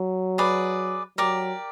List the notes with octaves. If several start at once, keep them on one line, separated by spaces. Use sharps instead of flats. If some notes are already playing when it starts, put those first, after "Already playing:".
Already playing: F#3
G#4 B4 D5
F#3 G4 A#4 D5